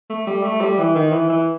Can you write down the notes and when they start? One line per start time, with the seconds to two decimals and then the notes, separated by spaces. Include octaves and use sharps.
0.10 A3
0.27 G3
0.44 A3
0.61 G3
0.78 E3
0.96 D#3
1.12 E3
1.29 E3